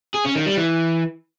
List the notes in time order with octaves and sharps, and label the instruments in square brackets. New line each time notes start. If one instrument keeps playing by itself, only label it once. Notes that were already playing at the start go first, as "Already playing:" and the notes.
[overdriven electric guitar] G#4
C#4
D#3
G3
E3